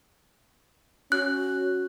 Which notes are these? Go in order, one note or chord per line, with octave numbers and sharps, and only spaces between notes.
C#4 F#4 F#6